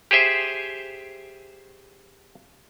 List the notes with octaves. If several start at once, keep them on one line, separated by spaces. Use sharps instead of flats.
G4 G#4 C5 E5